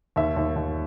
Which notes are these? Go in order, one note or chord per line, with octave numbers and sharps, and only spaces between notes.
D#2 E5
D#2
D#2